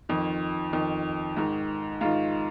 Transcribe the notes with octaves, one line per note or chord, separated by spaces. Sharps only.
F2 D#3
F2 D#3
G#2 D#3
G#2 D#3 F4